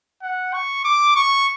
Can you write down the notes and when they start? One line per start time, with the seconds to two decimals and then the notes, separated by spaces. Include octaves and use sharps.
0.22 F#5
0.54 C#6
0.85 D6
1.16 C#6